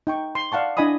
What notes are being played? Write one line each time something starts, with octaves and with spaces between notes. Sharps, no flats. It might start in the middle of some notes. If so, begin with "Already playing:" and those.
D#4 G5 C#6
C6
D5 F5 F#5 A5 C#6
D4 E4 D#5 G#5 B5 D#6